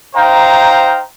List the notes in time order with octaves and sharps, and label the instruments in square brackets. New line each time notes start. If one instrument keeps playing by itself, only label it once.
[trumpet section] D#4 C5 F5 G5 A#5